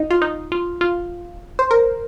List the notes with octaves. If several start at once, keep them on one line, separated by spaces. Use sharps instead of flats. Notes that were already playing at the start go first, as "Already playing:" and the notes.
Already playing: D#4
F4
D#4
F4
F4
C5
A#4